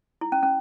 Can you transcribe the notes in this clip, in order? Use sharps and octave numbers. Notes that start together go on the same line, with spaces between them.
E4
C#4
C#4